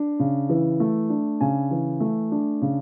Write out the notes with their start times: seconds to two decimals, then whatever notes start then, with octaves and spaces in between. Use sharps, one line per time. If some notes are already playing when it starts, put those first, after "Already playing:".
Already playing: D4
0.19 C#3
0.49 E3
0.80 A3
1.10 D4
1.41 C#3 G#5
1.71 E3
2.00 A3
2.32 D4
2.62 C#3